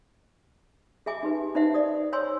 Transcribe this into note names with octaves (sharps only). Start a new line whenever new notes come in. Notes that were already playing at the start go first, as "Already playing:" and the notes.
G#4 E5 G#5 D6
D#4 G4 B4
D#4 B4 C5 E5 F#5
D5 D#6
C5 C#5 G#5 C6 E6